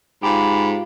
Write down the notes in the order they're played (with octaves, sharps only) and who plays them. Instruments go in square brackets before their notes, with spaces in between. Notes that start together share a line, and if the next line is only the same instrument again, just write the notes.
[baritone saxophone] G#2 [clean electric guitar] F4 G4 [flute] B5